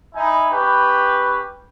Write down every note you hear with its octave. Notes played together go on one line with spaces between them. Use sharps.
D#4 E4 G#5 B5
C#4 G4 B4